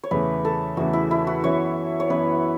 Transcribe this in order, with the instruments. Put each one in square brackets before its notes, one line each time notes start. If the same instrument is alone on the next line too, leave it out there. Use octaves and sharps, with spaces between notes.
[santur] C#5
[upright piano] E2 C#3 E3 A3 [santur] B4
[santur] A4
[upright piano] E2 C#3 E3 A3 [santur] F#4
[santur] E4
E4
F#4
[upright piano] F#2 E3 B3 [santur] C#5
[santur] C#5
[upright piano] F#2 E3 B3 [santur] B4